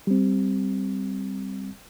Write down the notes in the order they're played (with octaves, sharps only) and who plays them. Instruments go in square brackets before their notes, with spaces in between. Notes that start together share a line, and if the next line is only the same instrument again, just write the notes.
[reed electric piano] G3 C4